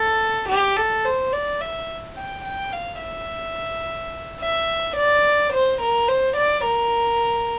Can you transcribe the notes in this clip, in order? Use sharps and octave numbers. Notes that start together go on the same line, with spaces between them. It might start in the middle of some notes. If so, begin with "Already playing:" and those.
Already playing: A4
G4
A4
C5
D5
E5
G5
G5
F5
E5
E5
D5
C5
A#4
C5
D5
A#4